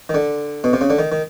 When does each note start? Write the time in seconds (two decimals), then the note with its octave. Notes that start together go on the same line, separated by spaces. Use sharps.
0.09 D#3
0.14 D3
0.64 B2
0.73 C3
0.81 C#3
0.90 D3
0.99 D#3
1.12 D#3